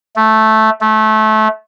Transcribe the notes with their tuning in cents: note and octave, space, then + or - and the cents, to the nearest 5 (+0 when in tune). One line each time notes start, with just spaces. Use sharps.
A3 -5
A3 -20